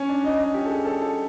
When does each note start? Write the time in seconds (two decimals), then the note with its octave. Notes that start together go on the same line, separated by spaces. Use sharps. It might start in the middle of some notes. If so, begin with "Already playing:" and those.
Already playing: C#4
0.09 D4
0.24 D#4
0.40 D#4
0.54 G4
0.65 A4
0.70 G#4
0.85 A4
1.01 A4